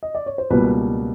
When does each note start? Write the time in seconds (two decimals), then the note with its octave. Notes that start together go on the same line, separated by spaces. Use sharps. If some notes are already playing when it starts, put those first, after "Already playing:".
0.03 D#5
0.15 D5
0.26 C#5
0.38 C5
0.50 C#2 B2 G3 A#3 B4